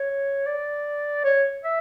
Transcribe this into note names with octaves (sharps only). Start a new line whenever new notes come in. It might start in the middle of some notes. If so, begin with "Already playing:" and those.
Already playing: C#5
D5
C#5
E5